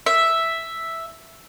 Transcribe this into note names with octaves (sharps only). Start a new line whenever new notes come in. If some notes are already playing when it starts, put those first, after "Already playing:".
E5